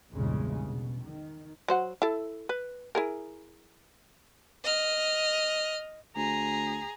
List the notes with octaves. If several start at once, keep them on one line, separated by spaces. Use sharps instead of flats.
A#1 E2 G2 A#2 C#3 G#3
B2
D#3
F#3 C5 F#5
E4 A4
B4
E4 G#4 A#4
D#5 F6
D2 G#4 A#5